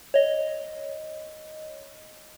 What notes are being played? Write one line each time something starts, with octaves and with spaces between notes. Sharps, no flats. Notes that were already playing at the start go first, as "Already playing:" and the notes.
C#5 D#5